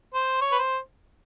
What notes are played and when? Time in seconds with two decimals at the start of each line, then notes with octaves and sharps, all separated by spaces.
0.14 C5
0.41 C#5
0.52 B4
0.58 C5